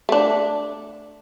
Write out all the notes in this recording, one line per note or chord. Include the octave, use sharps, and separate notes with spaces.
A3 D4